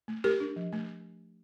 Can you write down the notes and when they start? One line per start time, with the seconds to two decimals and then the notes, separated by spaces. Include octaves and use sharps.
0.08 A3
0.24 A3 G4 A#4
0.40 D4
0.56 F3
0.72 A3